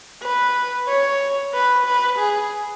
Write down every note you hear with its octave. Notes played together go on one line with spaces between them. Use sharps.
B4
C#5
B4
B4
G#4